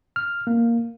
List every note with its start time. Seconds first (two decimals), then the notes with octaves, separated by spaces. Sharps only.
0.16 F6
0.47 A#3